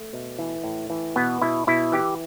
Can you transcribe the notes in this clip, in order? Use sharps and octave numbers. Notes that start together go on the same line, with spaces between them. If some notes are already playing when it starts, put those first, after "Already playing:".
Already playing: A3
B2
E3
A2
E3
B2 B3
B2 E4
B2 E4
E3 G4